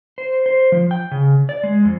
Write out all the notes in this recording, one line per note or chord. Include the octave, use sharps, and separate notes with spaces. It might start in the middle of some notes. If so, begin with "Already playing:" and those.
C5
C5
F3
G5
C#3
D5
G#3
F2